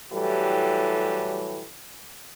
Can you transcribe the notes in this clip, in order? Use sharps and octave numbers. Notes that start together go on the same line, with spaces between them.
A2 E3 F#3 G3 G4 A4